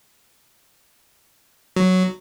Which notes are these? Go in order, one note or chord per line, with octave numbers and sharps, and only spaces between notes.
F#3